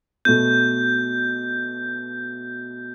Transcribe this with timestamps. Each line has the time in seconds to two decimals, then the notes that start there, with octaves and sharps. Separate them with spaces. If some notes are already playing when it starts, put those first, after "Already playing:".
0.25 B2 A3 B3 G6